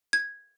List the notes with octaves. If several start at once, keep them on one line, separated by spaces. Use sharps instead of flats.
G#6